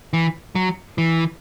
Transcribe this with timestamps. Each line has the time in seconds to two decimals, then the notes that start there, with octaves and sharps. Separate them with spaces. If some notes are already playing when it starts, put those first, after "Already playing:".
0.13 E3
0.55 F#3
0.98 E3